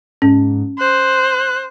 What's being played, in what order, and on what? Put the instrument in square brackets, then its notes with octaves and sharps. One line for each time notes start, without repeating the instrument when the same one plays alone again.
[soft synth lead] G#2 [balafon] C#4
[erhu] C5 [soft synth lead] F#6